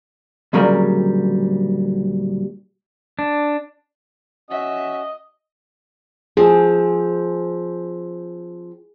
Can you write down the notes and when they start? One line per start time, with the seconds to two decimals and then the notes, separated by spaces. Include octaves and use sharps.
0.53 D2 A#2 C#3 F#3 G3 A#4
3.19 D4
4.50 C#4 F#4 D#5 E5
6.37 F3 C4 G#4